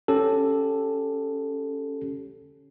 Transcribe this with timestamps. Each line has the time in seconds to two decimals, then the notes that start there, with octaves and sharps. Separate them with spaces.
0.08 C#4 G4 A4